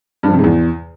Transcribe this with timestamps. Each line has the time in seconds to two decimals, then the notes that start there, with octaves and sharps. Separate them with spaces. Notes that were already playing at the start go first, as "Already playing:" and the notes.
0.23 G2
0.28 F3
0.34 C3
0.39 G#2
0.44 E2